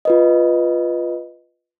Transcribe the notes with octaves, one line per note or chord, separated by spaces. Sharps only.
F4 B4 D#5